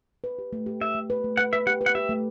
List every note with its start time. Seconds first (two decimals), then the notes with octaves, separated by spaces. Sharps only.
0.24 B4
0.39 G4
0.53 A3
0.66 G4
0.81 G4 E5
0.95 A3
1.10 B4
1.24 A3
1.37 B4 F#5
1.53 B4 E5
1.67 G4 F#5
1.81 B4
1.86 F#5
1.95 G4 E5
2.09 A3